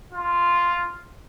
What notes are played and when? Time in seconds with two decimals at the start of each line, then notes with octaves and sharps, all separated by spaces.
0.13 F4